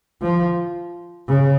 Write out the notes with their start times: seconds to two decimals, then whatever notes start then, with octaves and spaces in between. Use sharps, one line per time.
0.22 F3
1.28 C#3